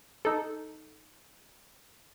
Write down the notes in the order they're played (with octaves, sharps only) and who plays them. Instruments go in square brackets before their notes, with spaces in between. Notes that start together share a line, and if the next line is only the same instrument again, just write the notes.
[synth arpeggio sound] D#4 A4